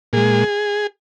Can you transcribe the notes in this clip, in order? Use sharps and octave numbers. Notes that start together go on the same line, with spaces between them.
A#2 G#3 G#4